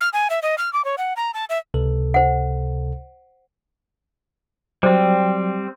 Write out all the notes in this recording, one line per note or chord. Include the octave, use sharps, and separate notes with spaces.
F6
G#5
E5
D#5
F6
D6
C#5
F#5
A#5
A5
E5
C#2 C3 A4
C5 F#5
F#3 G3 C4 C5